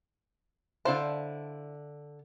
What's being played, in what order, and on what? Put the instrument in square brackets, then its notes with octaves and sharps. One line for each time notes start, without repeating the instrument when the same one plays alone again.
[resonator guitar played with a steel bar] D3 F5 A5 [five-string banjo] E4 C5